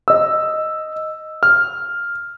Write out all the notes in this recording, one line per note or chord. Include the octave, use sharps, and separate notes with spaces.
D#5 E6
F6